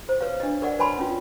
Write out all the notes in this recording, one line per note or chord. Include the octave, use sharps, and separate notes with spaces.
C5
B4 C#5 F5
D4 D#5
A#4 D5 F#5
B4 C#5 G#5 A5 B5 C6
C#4 F4